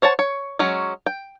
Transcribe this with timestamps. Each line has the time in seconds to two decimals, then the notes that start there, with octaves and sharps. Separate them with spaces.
0.02 C5 C#5 F#5 A5
0.19 C#5
0.59 F#3 G#3 C#4
1.06 G5